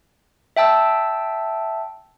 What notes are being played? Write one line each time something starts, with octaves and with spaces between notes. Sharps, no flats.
E5 G5 A5 E6